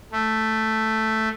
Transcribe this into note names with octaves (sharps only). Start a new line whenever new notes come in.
A3